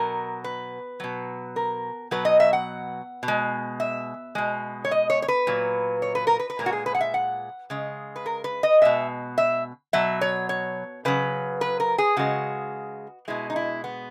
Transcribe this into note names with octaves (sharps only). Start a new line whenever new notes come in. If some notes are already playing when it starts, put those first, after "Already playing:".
Already playing: B2 F#3 A#4
B4
B2 F#3
A#4
B2 F#3 B4
D#5
E5
F#5
B2
G#3
E5
B2 G#3
C#5
D#5
C#5
C#5
B4
A#2 F#3
C#5
B4
A#4
B4
B4
A#2 G#3 A#4
F#4
G#4
B4
F#5
E5
F#5
C#3 G#3
B4
A#4
B4
D#5
B2 G#3 E5
E5
B2 F#3 E5
C#5
C#5
C#3 F#3 B4
B4
A#4
G#4
C#3 G#3 F#4
B2 G#3 E4
D#4
E4
B3